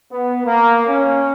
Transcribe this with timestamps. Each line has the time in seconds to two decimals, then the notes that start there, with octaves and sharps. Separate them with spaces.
0.11 B3
0.44 A#3
0.88 C#4